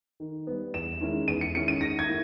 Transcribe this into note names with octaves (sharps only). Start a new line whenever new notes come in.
D#3
G3 B3
E2 E7
D#3 G#3 C#4 E4
E2 D#7
C#7
D#3 G#3 C#4 E4 C#7
D#7
D#3 A#6
G#6
A#3 E4